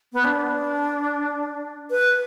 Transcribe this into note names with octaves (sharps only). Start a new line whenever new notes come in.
B3
D4
B4